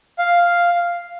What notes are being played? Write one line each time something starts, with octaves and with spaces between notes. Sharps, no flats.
F5